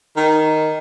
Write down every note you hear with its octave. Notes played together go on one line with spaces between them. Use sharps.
D#3